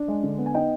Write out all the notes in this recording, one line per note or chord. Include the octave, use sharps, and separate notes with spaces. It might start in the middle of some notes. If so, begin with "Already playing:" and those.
Already playing: D4
G#3
D3
B3
G#5
D#4 D#5 G5